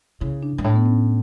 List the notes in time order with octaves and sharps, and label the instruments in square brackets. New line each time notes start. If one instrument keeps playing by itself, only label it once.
[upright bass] C#3 [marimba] E4
[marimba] D4
[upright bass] G2
[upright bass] A2 [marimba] D4
[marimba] B3
C#4